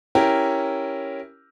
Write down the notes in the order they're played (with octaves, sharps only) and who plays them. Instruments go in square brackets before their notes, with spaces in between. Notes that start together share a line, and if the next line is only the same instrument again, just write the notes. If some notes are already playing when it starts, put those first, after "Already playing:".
[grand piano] C#4 E4 G4 A#4